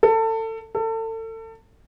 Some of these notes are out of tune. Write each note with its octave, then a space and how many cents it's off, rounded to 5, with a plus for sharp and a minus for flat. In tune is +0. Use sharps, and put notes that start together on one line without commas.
A4 +25
A4 +30